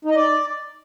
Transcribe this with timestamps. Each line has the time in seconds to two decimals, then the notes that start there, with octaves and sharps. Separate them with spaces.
0.05 D#4
0.11 D#5
0.16 D5